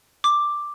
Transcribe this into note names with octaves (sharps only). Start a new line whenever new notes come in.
D6